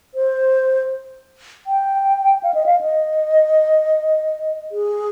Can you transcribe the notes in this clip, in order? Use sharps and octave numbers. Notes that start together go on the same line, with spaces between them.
C5
G5
F5
D#5
F5
D#5
G#4